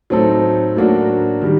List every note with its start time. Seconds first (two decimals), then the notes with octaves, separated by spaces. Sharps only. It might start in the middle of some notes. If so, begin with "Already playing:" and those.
0.10 A2 F#3 C4 D#4 A4
0.76 A2 F#3 A#3 D4 F#4
1.42 D#3 G3